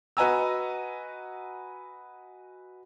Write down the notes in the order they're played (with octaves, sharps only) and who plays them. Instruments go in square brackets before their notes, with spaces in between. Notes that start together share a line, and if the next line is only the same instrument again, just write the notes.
[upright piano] F#4 B4 D#5 G#5 A#5 E6